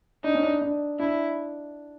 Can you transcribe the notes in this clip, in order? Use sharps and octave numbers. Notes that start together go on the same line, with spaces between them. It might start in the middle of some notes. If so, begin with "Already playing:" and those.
D4 D#4
C#4
D4
D4
D4 E4